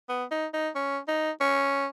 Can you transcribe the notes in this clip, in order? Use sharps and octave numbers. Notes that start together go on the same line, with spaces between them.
B3
D#4
D#4
C#4
D#4
C#4